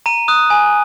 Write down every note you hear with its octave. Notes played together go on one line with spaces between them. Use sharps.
A#5 D#7
D#6 F#6
G#5